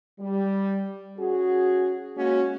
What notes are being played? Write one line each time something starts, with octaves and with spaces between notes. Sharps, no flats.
G3
C#4 F#4 G#4
G#3 A#3 C#4 F#4